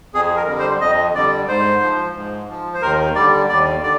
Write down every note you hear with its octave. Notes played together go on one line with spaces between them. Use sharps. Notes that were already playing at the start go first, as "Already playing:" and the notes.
F2 G#4
A#4
D3 G3
C5
F2 D#5
D3 G3 D5
G#2 C5
F3
G#2
F3
C5
D#2 A#4
D3 G3 D5
D#2 D5
D3 D5